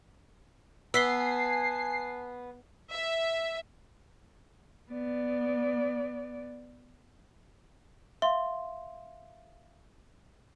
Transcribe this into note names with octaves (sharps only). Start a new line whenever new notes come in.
B3 G#5 A5 E6 B6 C7 G7
E5
B3 D5
E5 F5 C6